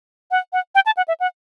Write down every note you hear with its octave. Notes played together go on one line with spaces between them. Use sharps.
F#5
F#5
G5
A5
F#5
E5
F#5